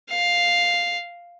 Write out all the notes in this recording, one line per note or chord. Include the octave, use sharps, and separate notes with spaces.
F5